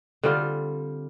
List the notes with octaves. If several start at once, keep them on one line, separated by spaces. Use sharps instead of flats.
D3 G3 C4 F4